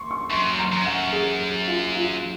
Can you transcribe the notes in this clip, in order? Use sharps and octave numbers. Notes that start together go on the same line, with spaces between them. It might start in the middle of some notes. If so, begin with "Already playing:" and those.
Already playing: C6 C#6
C#6
F#2 C6
A#5
F#2
F#5
G#4
G#4
F4
F4